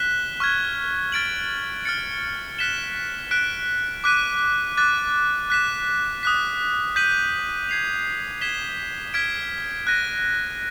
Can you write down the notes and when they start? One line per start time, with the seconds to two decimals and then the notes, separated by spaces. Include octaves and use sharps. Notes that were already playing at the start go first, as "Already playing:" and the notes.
Already playing: F#6 B6 E7 G7
0.40 C#6 F6 G#6
1.12 F6 A6 D7 F#7
1.85 F6 A6 C#7
2.58 F#6 B6 E7 G7
3.31 F#6 B6 D7
4.04 D6 F#6 B6 D#7
4.77 D6 F#6 A6
5.50 F#6 B6 E7
6.23 D#6 F#6 B6
6.96 G6 B6 D#7 F#7
7.69 G#6 C7 F7
8.41 G#6 B6 E7 G7
9.14 F6 G#6 B6 D7
9.87 F#6 A#6 D#7